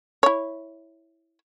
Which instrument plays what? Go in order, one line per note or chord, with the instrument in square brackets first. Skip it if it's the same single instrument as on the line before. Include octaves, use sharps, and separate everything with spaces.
[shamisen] E4 C#5